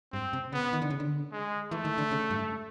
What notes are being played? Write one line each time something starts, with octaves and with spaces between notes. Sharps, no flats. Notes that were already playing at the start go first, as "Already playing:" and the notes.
G2 C4
C3
C#3 B3
D#3
D3
C#3
D3
G#3
E3 A3
D#3
D3
C#3
G2